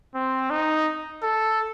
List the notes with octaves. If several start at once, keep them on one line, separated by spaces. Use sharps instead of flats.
C4
D#4
A4